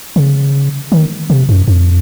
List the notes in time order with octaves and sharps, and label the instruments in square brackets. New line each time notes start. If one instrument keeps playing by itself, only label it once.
[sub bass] C#3
D#3
C3
F#2
F2